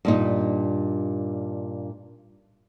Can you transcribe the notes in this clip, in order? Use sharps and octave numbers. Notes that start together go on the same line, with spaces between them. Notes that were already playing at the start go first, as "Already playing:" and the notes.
G2 A#2 D#4